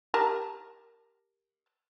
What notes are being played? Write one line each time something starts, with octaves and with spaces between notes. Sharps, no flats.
G4 A#4 A5